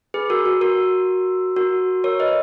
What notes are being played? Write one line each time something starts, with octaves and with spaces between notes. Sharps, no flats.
G#4 B4
F#4 A#4
F#4
F#4 A#4
F#4 A#4
A#4 C#5
B4 D#5